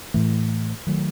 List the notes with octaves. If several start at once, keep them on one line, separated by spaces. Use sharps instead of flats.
A2 E3 A3
D#3 F#3 A3